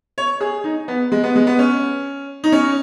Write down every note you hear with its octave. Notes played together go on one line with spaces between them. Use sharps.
C#5
G#4
D#4
B3
G#3
B3
G#3
B3
C#4
D#4
C#4